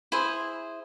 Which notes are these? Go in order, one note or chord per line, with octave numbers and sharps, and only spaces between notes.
E4 G#4 C5